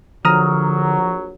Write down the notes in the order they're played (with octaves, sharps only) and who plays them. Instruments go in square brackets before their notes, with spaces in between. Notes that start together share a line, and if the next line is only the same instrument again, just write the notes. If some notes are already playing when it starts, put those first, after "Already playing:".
[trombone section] A#1 F#3 [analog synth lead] D3 [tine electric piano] F3 [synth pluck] A#5 D#6 F6